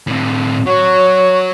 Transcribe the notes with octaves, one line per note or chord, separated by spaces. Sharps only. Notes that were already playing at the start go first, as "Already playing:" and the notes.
A2 C4
F#3 C#5 C#6